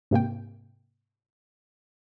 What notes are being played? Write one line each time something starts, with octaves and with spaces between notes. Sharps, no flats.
G#2 C3 A#3 G5